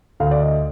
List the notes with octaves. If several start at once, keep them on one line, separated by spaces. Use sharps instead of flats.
D2 F5
D5
D#5